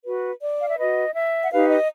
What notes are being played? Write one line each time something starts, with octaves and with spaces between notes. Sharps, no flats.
F#4 B4
D5
F5
E5
F#4 B4 D#5
E5
F#5
D#4 G4 B4 F5
D#5